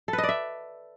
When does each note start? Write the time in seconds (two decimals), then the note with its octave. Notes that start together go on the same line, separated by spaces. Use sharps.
0.08 A4
0.13 B4
0.18 D#5
0.23 D5
0.29 E5